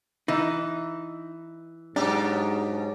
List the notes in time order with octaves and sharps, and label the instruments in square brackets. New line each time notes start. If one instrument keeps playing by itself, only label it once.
[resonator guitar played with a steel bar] E3 [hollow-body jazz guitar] D#4
[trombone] G#2 [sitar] B2 F#3 G4 [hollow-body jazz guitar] D4